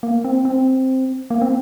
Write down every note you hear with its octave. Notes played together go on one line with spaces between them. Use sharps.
A#3
C4
C4
A#3
C4